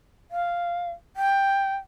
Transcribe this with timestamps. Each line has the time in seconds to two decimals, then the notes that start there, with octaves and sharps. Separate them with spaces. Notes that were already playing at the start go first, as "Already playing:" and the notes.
0.31 F5
1.16 G5